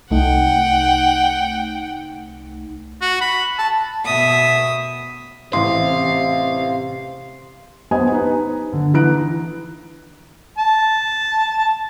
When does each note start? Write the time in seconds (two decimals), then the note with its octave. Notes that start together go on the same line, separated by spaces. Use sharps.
0.10 C2 A3 D#4 F#5 G5
3.01 F#4
3.21 B5
3.59 A5
4.04 B2 E5 D#6
5.53 A1 C3 F5 C6
7.91 B3 G4 B4 C5 D#5 G#5
8.12 D#4 B4
8.73 D3
8.94 E3 D#4 A#5 F#6 D7
10.58 A5